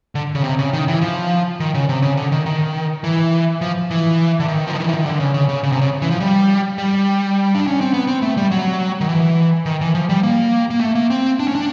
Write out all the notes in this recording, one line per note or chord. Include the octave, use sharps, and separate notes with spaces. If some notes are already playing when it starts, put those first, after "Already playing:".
D3
C#3
C3
C#3
D#3
E3
F3
D#3
C#3
C3
C#3
D3
D#3
D#3
E3
F3
E3
D3
D#3
F3
E3
D#3
D3
C#3
C#3
C#3
C#3
C3
C#3
E3
F3
G3
G3
D4
C#4
C4
B3
C4
A3
G3
F#3
D#3
E3
D#3
E3
F3
G3
A#3
A#3
A3
A#3
C4
D4
C#4
D4